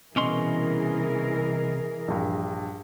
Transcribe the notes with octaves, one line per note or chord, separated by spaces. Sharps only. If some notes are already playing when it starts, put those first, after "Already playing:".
C2 B2 E3 C#4 G#4 A#4 C6
A#1 G2